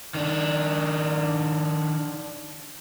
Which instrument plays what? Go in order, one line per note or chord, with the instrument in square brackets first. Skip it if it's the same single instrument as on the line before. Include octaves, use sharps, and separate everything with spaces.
[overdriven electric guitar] D#3 D4